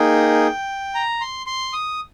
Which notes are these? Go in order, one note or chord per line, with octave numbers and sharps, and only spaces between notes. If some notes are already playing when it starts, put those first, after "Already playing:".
Already playing: A#3 D#4 G#4 G5
A#5
C6
C6
D#6